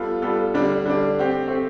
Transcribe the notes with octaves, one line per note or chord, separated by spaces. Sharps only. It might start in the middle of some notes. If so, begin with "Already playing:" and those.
Already playing: G3 B3 F4 A4
G3 B3 F4 A4
D3 G3 D4
D3 G3 D4
A3 C4 G4
A3 C4 G4